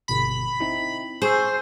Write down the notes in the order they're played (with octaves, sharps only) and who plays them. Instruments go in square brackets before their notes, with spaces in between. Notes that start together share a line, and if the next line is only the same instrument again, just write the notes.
[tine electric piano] G1 B2 B6 [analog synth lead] B5
[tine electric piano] C4 D#4 E4
[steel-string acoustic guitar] G#4 [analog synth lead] C5 [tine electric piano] G#5 C#6 E6